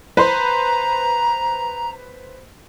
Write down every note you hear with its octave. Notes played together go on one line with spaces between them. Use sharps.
B4 C5 A#5 C6